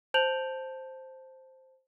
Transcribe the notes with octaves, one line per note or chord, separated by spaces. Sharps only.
C5 A5 G6 D7 F7 F#7